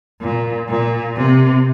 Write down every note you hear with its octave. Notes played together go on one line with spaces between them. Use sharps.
A#2
A#2
C3